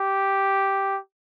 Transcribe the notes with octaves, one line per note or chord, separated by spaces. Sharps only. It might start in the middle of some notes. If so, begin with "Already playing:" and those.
Already playing: G4